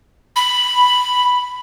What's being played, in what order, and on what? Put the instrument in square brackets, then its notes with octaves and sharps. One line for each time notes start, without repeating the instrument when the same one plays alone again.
[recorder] B5